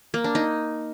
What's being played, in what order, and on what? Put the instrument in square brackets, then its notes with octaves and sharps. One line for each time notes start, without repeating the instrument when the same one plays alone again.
[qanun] A#3
D4
D#4